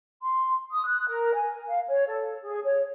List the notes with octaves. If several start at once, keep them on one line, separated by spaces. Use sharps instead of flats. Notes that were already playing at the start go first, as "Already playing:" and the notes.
C6
D#6
F#6
A#4
G#5
F5
C#5
A4
G#4
C#5